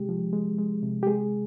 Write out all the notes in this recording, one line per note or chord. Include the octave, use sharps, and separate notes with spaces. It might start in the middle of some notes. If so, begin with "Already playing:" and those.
Already playing: C3 G#3 G4
F3
G#3
G#3
C3
G4
G#3 G#4